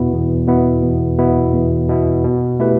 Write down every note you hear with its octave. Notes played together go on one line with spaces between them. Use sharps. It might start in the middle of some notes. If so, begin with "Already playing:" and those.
Already playing: E2 B2 B3 E4
E2
B2 B3 E4
E2
B2 B3 E4
E2
B2 B3 E4
B2
A3 E4 G4 B4